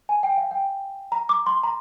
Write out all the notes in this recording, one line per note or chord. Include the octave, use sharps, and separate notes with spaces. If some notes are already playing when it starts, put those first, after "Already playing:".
G#5
G5
F5
G5
A#5
D6
C6
A#5